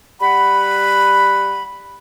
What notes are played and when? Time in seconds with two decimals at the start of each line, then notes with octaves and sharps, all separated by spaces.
0.20 G3 F#5 B5